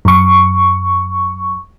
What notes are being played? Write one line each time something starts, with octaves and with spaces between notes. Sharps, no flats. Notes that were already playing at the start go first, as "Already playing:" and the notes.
F#2 C#6